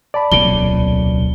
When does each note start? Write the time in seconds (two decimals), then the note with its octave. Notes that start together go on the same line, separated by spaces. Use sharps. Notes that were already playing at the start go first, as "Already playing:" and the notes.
0.14 D5 A5 B5
0.32 D1 B1 A#2 C#3 G7